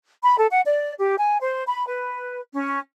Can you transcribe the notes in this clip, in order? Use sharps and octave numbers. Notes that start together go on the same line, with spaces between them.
B5
A4
F#5
D5
G4
G#5
C5
B5
B4
C#4